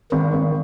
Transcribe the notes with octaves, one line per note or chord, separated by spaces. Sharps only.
G#1 D#3
G#1